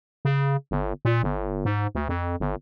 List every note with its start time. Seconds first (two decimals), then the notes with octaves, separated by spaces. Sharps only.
0.25 C#3
0.71 G1
1.05 A#2
1.23 G1
1.65 G#2
1.95 D2
2.09 F2
2.40 G1